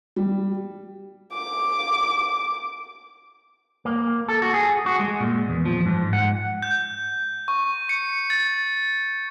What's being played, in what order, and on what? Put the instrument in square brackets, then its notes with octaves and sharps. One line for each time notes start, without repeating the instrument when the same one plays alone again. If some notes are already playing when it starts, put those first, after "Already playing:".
[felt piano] G3
[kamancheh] D6
[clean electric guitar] A#3
A4
F#4
G#4
F#4
G#3
A#2
E2
F3
G#2
F#5
[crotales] G6
C#6
C#7
A6